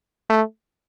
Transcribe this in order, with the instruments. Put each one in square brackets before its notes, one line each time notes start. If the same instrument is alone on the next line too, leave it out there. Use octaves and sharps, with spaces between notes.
[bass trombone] A3